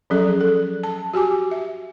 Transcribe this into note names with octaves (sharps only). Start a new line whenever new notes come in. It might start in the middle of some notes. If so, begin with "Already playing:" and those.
F3 F#3 C#4 G#4 A4 D5
A4
A5
F#4 G4 G#5 D6
E5